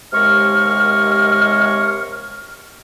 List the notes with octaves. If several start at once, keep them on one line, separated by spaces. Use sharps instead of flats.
D#2 C3 G#3 C#6 F6